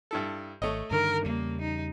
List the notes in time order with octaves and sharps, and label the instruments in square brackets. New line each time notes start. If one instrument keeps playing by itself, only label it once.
[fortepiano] G2 E4 A4
[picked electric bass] G#1 [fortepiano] A3 C#5 D#5
[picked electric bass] G2 D3 D#3 [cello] A#4
[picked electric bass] E2 C#3 G3 [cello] A#3
[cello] D#4